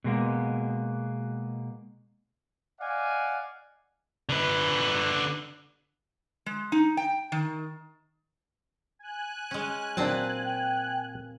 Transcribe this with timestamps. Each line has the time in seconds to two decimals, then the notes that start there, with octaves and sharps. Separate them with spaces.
0.04 B2 G#3 A#3 B3
2.80 D5 D#5 F5 F#5 G#5
4.29 D3 B4
6.46 G#3
6.72 D#4
6.97 G5
7.32 D#3
8.99 G#5 F#6
9.51 G#3 C#4
9.97 A#2 F#3 C4 D4 A5
10.45 G5